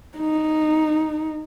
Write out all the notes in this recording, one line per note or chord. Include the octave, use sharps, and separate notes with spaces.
D#4